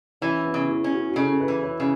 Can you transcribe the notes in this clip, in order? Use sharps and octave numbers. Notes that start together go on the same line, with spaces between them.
E3 C#4
B3
C#3
E4
C#4
F#4
F#4
C#3 A4
A4
B4
E3
C#5
C#3